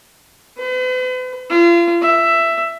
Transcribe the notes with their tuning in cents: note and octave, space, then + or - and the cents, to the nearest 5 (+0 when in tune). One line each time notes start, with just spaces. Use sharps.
B4 +45
F4 -35
E5 +10